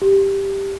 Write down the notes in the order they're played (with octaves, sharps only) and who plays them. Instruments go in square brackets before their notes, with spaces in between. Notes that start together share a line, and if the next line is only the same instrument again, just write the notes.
[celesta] G4